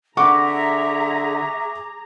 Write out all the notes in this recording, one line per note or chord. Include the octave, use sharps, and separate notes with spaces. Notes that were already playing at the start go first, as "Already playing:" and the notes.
D3 G#4 E5 F#5 A#5 C#6 D6